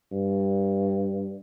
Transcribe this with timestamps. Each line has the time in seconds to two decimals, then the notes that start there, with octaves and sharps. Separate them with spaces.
0.11 G2